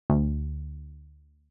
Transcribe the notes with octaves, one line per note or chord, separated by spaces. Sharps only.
D2